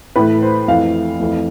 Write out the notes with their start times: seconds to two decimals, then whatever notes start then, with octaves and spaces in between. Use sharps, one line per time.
0.16 A2 E3 A3 B4
0.42 C5
0.68 F2 E3 A3 F5
1.20 F2 E3 A3